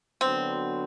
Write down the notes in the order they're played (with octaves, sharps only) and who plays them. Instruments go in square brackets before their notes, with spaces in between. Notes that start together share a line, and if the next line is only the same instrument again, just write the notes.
[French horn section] D3 F#3 B3 D4 F#4 [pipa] C4